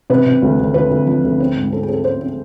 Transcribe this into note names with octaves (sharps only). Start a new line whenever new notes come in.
C3 B4
C3
D2
D2
D2 B4
D2
F3
D2
C4
G#2
C4 A4
G#4
C4 A4
C4 C5
C4